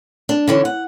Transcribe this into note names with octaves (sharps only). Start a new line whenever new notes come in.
D4
D3 E3 C#4
F#5